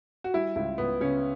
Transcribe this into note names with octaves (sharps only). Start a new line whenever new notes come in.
F#4
G3 E4
C#2 E4
C#2 B3
C#3 C#4